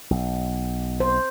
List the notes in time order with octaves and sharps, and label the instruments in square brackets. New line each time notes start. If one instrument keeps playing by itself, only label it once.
[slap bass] B1
[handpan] C5